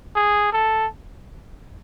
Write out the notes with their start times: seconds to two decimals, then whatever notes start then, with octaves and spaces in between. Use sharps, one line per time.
0.16 G#4
0.53 A4